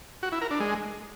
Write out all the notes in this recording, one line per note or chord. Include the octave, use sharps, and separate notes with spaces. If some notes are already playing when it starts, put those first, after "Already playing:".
F#4
E4
A#4
D4
G#3